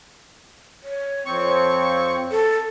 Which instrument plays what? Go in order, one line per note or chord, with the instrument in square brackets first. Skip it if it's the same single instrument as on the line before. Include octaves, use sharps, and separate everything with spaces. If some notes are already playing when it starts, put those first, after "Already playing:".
[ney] C#5
[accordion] F2 C4 C#6
[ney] A4